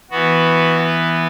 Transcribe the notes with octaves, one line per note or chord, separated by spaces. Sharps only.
E3 B3 F#4
B4